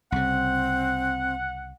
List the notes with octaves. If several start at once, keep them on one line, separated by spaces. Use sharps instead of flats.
C2 C#3 C4 F#5